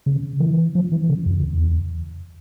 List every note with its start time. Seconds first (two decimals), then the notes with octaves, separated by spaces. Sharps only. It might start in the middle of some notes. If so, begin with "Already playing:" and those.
0.06 C#3
0.40 E3
0.75 F3
0.92 E3
1.09 C#3
1.26 F2
1.43 E2